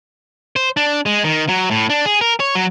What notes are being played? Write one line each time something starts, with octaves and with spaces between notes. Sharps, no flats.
C5
D4
G#3
D#3
F#3
A2
D4
G#4
A#4
C#5
F#3